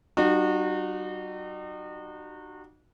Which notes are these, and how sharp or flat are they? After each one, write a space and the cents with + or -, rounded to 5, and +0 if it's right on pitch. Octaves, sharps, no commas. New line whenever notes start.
G3 -45 D#4 -40 F#4 -25